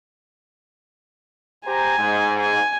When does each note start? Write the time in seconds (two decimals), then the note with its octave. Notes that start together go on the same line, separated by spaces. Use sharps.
1.67 G4 C5 G#5 A#5
1.98 G#2
2.39 G#5